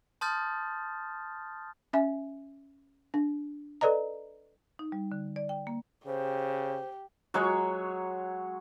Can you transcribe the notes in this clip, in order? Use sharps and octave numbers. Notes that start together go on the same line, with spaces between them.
A5 C6 D#6 F6 G6 A6
C#4 E5 G#5
D4
A4 B4 D5 D#5 A#5
D#4
G3
D3
D5
G5
A#3
C#3 G4 C5
F#3 G#3 C#5